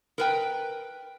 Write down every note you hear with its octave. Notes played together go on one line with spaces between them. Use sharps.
A#4 B4 G5